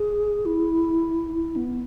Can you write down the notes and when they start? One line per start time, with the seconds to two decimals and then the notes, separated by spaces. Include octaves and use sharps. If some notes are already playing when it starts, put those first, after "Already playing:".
Already playing: G#4
0.46 E4
1.34 E4
1.56 B3